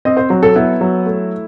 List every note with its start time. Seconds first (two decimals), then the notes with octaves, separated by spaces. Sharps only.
0.05 C4 D#5
0.17 C5
0.30 F#3
0.43 A4
0.55 B3 E4
0.81 F#3
1.06 A3